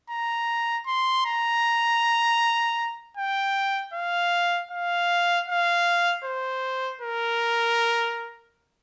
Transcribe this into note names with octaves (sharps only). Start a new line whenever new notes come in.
A#5
C6
A#5
G5
F5
F5
F5
C5
A#4